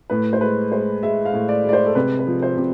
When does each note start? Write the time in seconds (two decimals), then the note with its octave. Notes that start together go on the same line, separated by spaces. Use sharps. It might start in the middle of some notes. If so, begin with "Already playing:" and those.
0.10 A2 B4
0.33 C5
0.41 G#3 B4
0.72 G#3 C5
1.03 G#3 E5
1.25 F5
1.33 A2
1.49 D5
1.65 G#3 D5
1.73 C5
1.86 A4
1.95 C3 B4
2.19 B4
2.27 F3
2.42 C5
2.57 C3